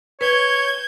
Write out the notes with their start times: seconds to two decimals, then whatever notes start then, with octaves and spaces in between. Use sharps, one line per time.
0.21 B4 C#5 G6 G#6